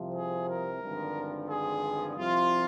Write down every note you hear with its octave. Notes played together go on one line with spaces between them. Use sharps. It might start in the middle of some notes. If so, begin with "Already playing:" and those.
Already playing: C2 C3 F3
G#4
A#4
G#1 G2 D3 F3
G#4
C2 C3 F3 F4